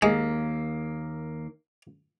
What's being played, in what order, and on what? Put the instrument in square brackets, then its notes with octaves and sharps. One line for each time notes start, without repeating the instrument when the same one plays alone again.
[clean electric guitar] D#2 A#3 [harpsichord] G#3